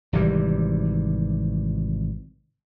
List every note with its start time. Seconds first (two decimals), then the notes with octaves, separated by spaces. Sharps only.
0.13 G#1 C3 E3 G3